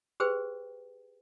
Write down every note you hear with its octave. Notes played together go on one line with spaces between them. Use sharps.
G4 G#4 B4 C5 G5